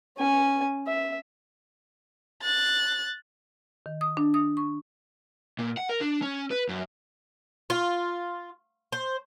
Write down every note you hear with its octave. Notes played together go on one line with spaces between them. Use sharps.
C#4 G#5
E5
F#6 A6
D#3
D#6
D4
D#6
C#6
A#2
F#5
A#4
D4
C#4
B4
F#2
F4
C5